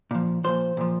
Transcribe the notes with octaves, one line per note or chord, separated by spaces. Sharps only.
A#2 F3
A#2 F3 C5
A#2 F3